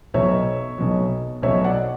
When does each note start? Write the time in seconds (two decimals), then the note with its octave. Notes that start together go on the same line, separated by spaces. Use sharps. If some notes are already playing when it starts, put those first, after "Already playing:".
0.14 B1 B2 F#3 C#5 E5
0.78 B1 B2 F#3
1.42 B1 B2 F#3 C#5 E5
1.64 D5 F#5